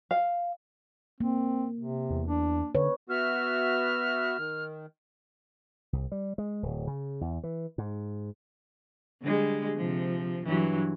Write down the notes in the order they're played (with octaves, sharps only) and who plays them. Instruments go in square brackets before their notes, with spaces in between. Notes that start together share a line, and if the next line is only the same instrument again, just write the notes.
[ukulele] F5
[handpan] A#3 [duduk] C4
[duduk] C3
[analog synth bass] E2
[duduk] D4
[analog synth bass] D3 [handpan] B4 C#5
[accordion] B3 F#4 E5 [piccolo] F6
[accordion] D#3
[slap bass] C2
G3
G#3
D1
C#3
E2
E3
G#2
[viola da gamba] D3 G3 G#3
C3 F3
G2 E3 F#3